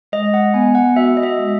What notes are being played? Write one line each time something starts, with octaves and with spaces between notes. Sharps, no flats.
G#3 D#5
F#5
B3 G#5
F#5
F#4 E5
D#5
E5
G#3